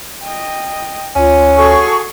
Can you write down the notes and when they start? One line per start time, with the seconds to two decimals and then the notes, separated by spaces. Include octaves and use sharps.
0.23 D#5 G5
1.15 D2 C#4 F4
1.56 F#4 G#4 A4 C#6